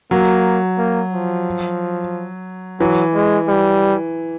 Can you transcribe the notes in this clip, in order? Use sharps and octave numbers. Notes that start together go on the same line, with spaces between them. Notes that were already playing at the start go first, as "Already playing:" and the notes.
F#3 A#3
A#3
F3
E3 F#3
G#3
G3